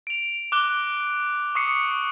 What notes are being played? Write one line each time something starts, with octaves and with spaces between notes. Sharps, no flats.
D7 F7
D6 F#6 G7
C#6 D#6 C7 C#7